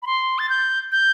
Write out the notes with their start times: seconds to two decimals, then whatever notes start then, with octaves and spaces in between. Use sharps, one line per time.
0.03 B5
0.07 C6
0.39 A6
0.49 G6
0.92 G6